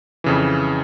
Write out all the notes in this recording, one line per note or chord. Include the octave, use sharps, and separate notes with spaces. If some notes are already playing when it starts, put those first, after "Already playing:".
F2 C#3 E3